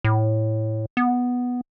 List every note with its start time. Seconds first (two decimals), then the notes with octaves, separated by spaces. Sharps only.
0.04 A2
0.97 B3